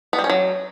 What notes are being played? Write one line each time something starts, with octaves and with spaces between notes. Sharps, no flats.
B3
G3
C#4
F#3